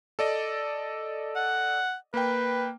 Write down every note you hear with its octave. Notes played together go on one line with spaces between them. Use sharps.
A4 D5 D#5
F#5
A#3 B4 G5